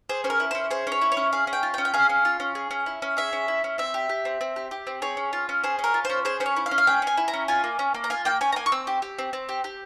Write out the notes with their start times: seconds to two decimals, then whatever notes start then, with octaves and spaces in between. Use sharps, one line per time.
0.09 G#4 C5
0.24 C#4 C5
0.30 A#4
0.40 E4
0.51 C#4 C5
0.70 G#4 C5
0.87 C#4 C#5
1.02 E4
1.12 C#5
1.17 C#4
1.33 G#4 F5
1.47 C#4
1.53 G5
1.63 F4
1.74 G5
1.78 C#4
1.85 G5
1.94 G#4 F5
2.09 C#4
2.25 F4
2.40 C#4
2.55 G#4
2.71 C#4
2.86 E4
3.02 C#4
3.17 G#4 E5
3.33 C#4
3.48 E4
3.64 C#4
3.78 C4 E5
3.94 G4
4.09 G4
4.25 C4
4.41 C4
4.56 G4
4.71 G4
4.87 C4
5.02 G#4 C#5
5.17 C#4
5.33 F4
5.49 C#4
5.64 G#4 C5
5.79 C#4
5.84 A#4
5.94 F4
6.05 C#4 C5
6.25 G#4 C5
6.40 C#4 C5
6.46 C#5
6.56 E4
6.66 F5
6.71 C#4
6.78 F5
6.87 G#4 G5
7.02 C#4 G#5
7.17 E4
7.28 A#5
7.34 C#4
7.48 F4 G#5
7.64 A#3
7.79 C#4
7.94 A#3
8.04 A#5
8.10 F4 G#5
8.25 A#3 G5
8.41 C#4 G#5
8.52 A#5
8.56 A#3 G#5
8.66 C#6
8.72 C4 E6
8.87 G4
9.02 G4
9.19 C4
9.33 C4
9.49 G4
9.64 G4